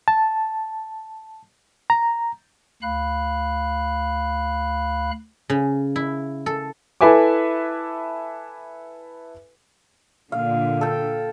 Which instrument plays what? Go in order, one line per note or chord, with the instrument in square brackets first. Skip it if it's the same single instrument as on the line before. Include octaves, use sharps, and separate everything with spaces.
[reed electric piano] A5
A#5
[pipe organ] D2 F5 B5 F#6
[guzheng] C#3
E4
A4
[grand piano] E4 A4 B4 E5 G#5 D6
[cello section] A#2 D3 [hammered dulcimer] F5
[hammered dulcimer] A4 G5